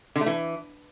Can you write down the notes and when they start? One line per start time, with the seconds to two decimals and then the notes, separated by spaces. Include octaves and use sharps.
0.16 D3
0.21 A3
0.26 E3